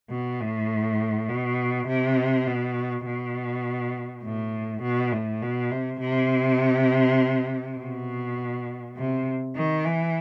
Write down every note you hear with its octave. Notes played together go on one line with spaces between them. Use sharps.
B2
A2
B2
C3
B2
B2
A2
B2
A2
B2
C3
C3
B2
C3
D#3
E3